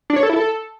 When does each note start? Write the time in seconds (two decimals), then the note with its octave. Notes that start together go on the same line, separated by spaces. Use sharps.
0.10 D4
0.16 C#5
0.23 A4
0.29 E4
0.36 A4